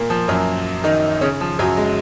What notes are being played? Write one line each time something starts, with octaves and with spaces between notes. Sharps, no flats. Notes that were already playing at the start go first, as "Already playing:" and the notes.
Already playing: A#2 A#3
F3
F#2 F#3
D#3 D#4
C#3 C#4
F3
F#2 F#3
G#3